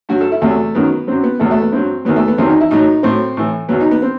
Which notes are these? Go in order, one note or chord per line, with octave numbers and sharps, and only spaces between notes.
G2 F#3 F#4
A4
E4
E2 C3 F#3 A3
F#2 D#3 F#3 B3
F#2 F#3 C4
B3
E2 B2 F#3 A3
A3
B3
G2 F#3 C4
E2 D#3 F#3 B3
A3
B3
E2 D#3 F#3 C4
D#4
E4
A2 F#3 D#4
A2 F#3 C4
A2 E3
E2 B2 F#3 B3
D#4
B3
C4